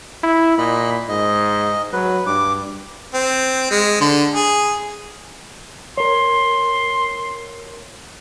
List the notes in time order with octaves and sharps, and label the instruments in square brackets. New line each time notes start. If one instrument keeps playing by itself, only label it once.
[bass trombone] E4
[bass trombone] A#2 [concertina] D#5 B5
[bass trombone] G#2 [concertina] D#5
[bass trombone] F#3 [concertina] B4
[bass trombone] G2 [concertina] D6
[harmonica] C4
G#3
D3
G#4
[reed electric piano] A#4 C#5 [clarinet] C6